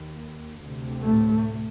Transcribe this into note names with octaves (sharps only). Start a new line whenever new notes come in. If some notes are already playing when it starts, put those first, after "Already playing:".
Already playing: D#2
D2 C3
A2 A3